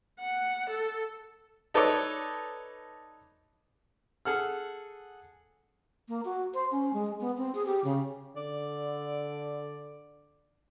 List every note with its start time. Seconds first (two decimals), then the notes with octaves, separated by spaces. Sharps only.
0.20 F#5
0.70 A4
1.74 D#4 A4 B4 C#5 D5 D6
4.25 G#4 A4 F#5 F6
6.09 A#3
6.25 F#4
6.54 C5
6.71 C#4
6.93 G#3
7.21 B3
7.37 C4
7.55 G#4
7.66 G4
7.84 C#3
8.36 D3 D5